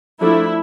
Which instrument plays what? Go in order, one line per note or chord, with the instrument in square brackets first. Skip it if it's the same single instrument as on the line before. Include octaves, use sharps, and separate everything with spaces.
[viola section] F3 A3 D4 E4